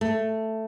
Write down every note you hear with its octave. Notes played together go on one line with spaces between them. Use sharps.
A3